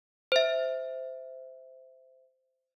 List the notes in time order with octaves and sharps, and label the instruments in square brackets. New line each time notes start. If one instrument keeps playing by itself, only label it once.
[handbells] C5 E5